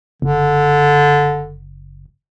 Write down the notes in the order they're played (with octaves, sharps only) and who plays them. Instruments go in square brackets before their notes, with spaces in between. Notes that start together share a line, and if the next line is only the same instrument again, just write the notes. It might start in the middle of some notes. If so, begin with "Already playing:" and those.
[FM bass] F#1 [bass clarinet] D3